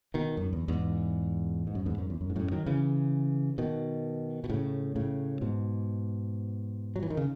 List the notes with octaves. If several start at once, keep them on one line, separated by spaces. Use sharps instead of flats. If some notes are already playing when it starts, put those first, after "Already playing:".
B2 D#3
F#2
E2
E2 G#2
G#2
F#2
E2 G#2
F#2
E2
F#2
G#2
F#2 A2
D#3 F#3
C#3 E3
B2 D#3
B2
A2 C#3
A2 C#3
G#2 B2
F#3
E3
D#3
C#3